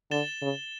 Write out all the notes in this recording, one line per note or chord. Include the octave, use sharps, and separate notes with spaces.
D3 A6 E7 G7
C#3